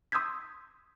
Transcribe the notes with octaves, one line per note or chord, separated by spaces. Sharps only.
C6 D#6 E6 G6 G#6 B6